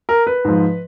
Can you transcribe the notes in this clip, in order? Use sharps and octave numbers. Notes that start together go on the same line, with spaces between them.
A#4
B4
G#2 F3